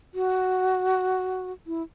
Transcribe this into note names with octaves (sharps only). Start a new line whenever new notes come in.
F#4
E4